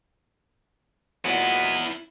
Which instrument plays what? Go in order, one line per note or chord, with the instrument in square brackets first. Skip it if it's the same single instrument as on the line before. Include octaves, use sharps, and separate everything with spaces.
[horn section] A#2 F#3 G#3 [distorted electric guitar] B3 E4